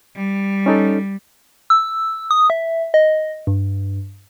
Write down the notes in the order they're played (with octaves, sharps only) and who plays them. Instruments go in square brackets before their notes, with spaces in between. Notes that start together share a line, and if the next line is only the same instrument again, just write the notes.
[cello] G3
[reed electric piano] C#4 D#4 A4
[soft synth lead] E6
D#6
E5
D#5
G2